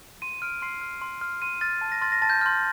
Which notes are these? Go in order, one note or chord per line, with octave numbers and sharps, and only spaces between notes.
C6 D#7
F6 D7
C6 C7
F6
C6
F6
C6 D#7
F6 A6
A5
A#6
C6 F6 A6
A#6
A5 A6
G6
C6 F6 G6